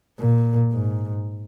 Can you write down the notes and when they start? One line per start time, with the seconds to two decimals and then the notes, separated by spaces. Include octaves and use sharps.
0.19 A#2
0.72 G#2